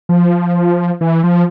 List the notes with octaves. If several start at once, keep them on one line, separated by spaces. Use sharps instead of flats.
F3
E3
F3